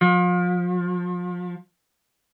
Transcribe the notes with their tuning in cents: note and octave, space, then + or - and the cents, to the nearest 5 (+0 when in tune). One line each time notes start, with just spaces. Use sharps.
F3 +35